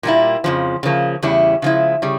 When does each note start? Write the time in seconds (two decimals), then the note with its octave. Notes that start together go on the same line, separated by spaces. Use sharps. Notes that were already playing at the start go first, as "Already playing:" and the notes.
0.03 A#2 G3 A#3 E4
0.44 F2 C#3 F3
0.83 C#3 F3 A#3
1.23 E2 C#3 G3 C#4 E4
1.62 C#3 F3 G#3 E4
2.02 C#3 G3